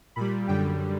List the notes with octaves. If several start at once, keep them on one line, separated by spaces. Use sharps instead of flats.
A#2 G3 B5
F#2 D3 G3 G5